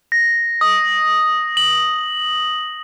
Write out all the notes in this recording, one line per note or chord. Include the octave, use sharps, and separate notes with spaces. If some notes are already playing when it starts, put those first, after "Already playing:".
A#6
D#6
F#7